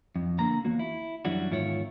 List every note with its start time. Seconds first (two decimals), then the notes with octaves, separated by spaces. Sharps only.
0.16 F2
0.39 D3 A#3 A#5
0.65 E2 A#3 F#4
0.79 E4
1.25 F#2 E3 G3 D4 E4 F#4
1.50 E2 G#2 D#3 E4 F4 C#5